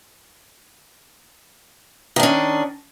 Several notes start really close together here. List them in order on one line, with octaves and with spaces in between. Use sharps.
D#3 D4 C#4